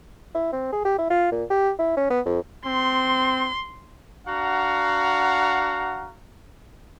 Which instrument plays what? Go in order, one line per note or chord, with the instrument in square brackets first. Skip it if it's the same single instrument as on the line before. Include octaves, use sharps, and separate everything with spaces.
[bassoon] E4
C4
G#4
G4
E4
F4
A#2
G4
E4
C#4
B3
F2
[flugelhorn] C4 [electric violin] C6
[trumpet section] D4 F#4 F5 F#5 A#5